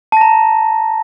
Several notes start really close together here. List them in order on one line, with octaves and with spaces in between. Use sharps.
A5 A#6 A#5